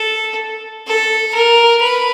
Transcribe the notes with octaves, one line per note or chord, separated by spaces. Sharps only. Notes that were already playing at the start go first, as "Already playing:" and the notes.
Already playing: A4
A4
A#4
B4